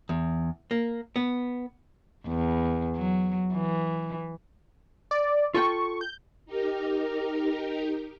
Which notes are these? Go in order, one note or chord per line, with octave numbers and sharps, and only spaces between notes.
E2
A#3
B3
E2
F#3
E3
D5
F4 A4 G5 C#6
G6
D#4 G4 A#4 A#5